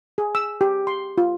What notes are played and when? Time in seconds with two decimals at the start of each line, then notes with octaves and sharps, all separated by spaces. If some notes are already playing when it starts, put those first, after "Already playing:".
0.18 G#4
0.35 E6
0.61 G4
0.87 C6
1.18 F4